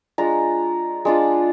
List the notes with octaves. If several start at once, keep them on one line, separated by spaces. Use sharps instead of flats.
G#3 D4 F4 A#5
G#3 D4 F4